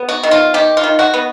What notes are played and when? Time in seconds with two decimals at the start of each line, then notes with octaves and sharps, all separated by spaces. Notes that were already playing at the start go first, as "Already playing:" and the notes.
Already playing: B3
0.09 F#4
0.23 D#3
0.31 F4
0.54 D#3 G4
0.77 F4
0.84 D#3
0.99 F#4
1.14 B3